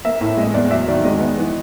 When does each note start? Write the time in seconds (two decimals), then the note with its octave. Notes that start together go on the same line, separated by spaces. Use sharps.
0.05 A#3 E5
0.21 A2
0.37 G#3 D#5
0.54 E2 D5
0.71 F#3 E5
0.88 D#3 D5
1.04 G#3 D#5
1.20 B3
1.38 E3